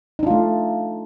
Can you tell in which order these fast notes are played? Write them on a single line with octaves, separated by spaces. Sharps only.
D#4 D4 F4 A3